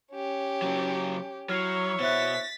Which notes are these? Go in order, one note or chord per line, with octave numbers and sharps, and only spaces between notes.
C#4 G4
C#3 F#3
F#3 E4 C#5 F6 C7 F7
B2 C5 E5 F#6 A6 B6